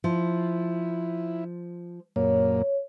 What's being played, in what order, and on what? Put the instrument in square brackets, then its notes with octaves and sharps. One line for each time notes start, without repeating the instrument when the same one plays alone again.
[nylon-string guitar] F3 [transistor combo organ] E4
[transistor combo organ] F#2 A#2 A#3 [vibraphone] C#5